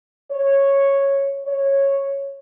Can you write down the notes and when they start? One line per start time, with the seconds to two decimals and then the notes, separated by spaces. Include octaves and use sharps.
0.30 C#5
1.46 C#5